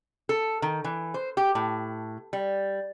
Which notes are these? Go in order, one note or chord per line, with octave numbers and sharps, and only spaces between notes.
A4
D#3
E3
C5
G4
A2
G3